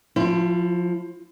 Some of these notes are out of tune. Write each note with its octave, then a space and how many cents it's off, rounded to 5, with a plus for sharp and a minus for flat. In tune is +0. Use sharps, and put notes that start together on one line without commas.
F3 +20 E4 +45